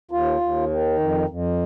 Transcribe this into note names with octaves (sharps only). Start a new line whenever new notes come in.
D#2 F4
D#2
D#3
F2
F2